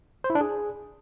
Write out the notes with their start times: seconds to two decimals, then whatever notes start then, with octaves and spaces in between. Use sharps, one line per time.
0.24 C5
0.30 E4
0.35 D4
0.41 G#4